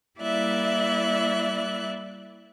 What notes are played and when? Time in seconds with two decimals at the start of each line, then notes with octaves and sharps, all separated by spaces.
0.19 G3 A#3 E4 D5 E5 F#6